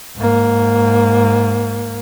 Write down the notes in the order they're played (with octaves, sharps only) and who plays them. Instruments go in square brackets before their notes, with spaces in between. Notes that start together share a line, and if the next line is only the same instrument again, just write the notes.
[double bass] G#2 A#3